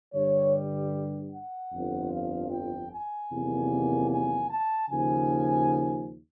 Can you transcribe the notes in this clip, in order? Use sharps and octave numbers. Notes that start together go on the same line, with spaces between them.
G2 D3 G3 C#5
F#5
G1 F2 D3 F3
F5
G5
G#5
E2 C3 D#3 F#3 A#3
G#5
A5
D#2 C#3 F3 G#5